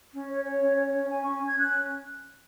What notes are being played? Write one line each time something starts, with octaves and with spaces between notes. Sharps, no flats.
C#4
C#5
C#5
C#4
C#5
C#4
C#4 G#5
C#4 C#6
G#5
C#4 G#6
C#4 F#6